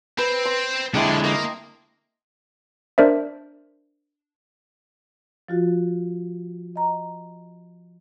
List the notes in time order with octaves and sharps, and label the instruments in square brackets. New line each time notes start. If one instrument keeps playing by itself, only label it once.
[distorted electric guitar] C4 [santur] B4
[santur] C6
[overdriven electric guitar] D3 G#3 [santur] C4 E4 A5 [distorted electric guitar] A4 D5
[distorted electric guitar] A#3 [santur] D#5 D#6
[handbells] D4 A#4 C5 D5 E5
[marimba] F3 F4 F#4
D#5 A#5